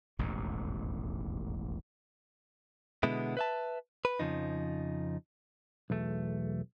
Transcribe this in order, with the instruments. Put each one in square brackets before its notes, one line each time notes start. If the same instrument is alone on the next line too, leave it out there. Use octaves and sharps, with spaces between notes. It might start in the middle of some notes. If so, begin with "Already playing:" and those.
[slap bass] E1 A1 D#2 G#2
[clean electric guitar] B2 D3 G#3 B3 E4
B4 E5 A5
B4
F2 C#3 F3 D#4
B1 E2 A3